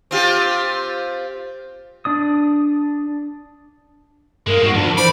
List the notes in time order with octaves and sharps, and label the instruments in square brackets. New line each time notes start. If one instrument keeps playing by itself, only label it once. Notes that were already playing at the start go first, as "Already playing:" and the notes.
[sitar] C4 F4 G4
[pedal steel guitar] D4 D5 D#6
[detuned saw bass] G2 [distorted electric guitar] G#3 A#3 [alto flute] A#4
[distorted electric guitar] E2 C4 [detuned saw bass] G#2 [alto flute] F#4
[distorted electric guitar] D2 [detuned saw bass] F3 [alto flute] D4
[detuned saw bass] E3 [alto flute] C5 [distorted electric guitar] D5 [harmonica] B5